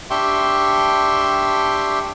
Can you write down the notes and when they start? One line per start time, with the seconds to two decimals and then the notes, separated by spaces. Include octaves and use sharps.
0.10 D4 G4 E5 G5 C6 C#6